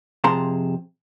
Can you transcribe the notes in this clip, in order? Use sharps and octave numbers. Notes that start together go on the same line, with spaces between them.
F2 C3 G#4 A5 A#5 C6